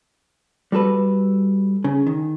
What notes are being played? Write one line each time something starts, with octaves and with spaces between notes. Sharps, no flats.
G3 F#4 A4 B4
C#3
D#3